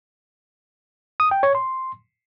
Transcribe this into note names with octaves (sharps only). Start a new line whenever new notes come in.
D#6
G5
C#5
C6